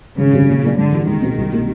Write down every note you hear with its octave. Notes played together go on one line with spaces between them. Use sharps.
G#1 C#3
F#2 D3 G3 C4
A#2
F#3 A#3 D4
G#2 D3
E3 G3
C#2 D#3
B2 G#3 C4
C2
B2 G3 A#3